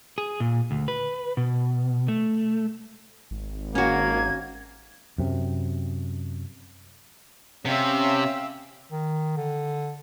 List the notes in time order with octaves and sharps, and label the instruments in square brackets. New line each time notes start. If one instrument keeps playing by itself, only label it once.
[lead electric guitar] G#4
A#2
D2
B4
B2
A3
[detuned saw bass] G#1
[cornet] A#3 [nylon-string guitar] C#4 F#4 [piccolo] G#6
[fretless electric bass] F#2 C3
[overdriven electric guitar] C3 [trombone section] C#4 [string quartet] E5 F5 G5
[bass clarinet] D#3
D3